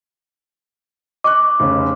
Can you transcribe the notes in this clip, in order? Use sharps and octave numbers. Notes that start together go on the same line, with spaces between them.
D#5 C#6 D6 F#6
F1 C#3